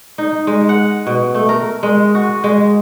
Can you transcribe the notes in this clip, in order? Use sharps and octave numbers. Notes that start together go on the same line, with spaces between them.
D#4
G#3
F#5
B2
A3
A#4
G#3
F#4
G#3